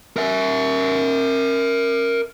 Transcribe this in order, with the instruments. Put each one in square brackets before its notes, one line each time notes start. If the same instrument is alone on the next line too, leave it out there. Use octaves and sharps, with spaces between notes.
[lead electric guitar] A#4 E5